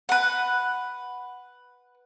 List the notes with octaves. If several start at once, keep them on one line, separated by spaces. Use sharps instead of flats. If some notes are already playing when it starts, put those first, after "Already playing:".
B4 F#5